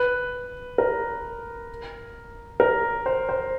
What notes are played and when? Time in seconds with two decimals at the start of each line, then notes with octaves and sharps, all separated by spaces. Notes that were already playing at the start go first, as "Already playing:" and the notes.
Already playing: B4
0.78 A#4
2.60 A#4
3.06 C5
3.29 C5